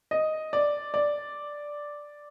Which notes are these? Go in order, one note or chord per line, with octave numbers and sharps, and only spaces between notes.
D#5
D5
D5